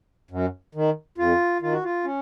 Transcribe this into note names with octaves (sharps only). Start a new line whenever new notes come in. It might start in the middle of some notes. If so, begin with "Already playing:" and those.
F#2
D#3
F2 F4
D#3 F4
F#4
F4
C#4